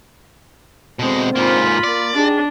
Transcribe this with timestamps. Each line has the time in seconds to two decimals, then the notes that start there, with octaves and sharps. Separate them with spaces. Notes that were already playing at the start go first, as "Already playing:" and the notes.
0.99 B2 D3 G#3 C4
1.36 G#2 A#3 F4 B5
1.84 A#3 D5
2.14 D4 D#4 G4 G#4